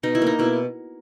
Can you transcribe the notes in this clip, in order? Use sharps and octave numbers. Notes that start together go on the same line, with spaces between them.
B2 D#4
E4
A#3 D#4
B2 E4